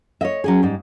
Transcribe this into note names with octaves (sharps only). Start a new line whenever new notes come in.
C#5 D#5 E5
F#3 C#4 G#4
G#2 G3